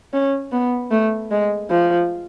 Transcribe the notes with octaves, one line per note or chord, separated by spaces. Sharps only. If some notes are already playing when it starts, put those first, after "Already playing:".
C#4
B3
A3
G#3
F3